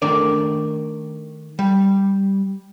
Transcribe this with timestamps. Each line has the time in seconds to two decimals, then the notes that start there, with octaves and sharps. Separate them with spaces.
0.02 D#3 A3 D4 A#4 D5
1.59 G3